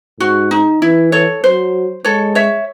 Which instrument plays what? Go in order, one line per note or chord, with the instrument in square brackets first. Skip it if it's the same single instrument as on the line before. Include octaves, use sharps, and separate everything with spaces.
[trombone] G#2 [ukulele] F#4
[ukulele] D#4
[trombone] E3 [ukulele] E4
[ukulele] A4 C#5
[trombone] F#3 [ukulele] C5
[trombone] G#3 [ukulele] A4 C#5
[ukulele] C#5 E5